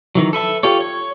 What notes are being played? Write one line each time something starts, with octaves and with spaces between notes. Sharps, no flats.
D#3 E3 F#3
A4 B4 E5 A5
F4 G4 A4 C#5
C#5